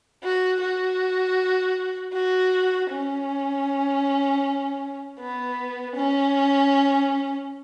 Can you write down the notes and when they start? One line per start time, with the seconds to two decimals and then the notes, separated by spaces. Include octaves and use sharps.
0.24 F#4
0.61 F#4
2.13 F#4
2.91 C#4
5.19 B3
5.96 C#4